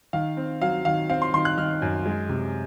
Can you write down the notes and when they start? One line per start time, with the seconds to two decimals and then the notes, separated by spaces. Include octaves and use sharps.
0.13 D#3 F5
0.37 C4
0.61 F#3 F5
0.85 D#3 F5
1.10 C4 F5
1.22 C6
1.34 D#3 C6
1.45 F#6
1.57 D#3 F6
1.82 F#2
2.06 G#3
2.29 C3